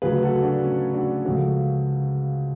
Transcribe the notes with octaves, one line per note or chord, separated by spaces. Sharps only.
D2 C#3 F#3 G#4 B4
F#4 A4
D4 F#4
C#4
D4 F#4
C#2 C#3 F3 F#4 A4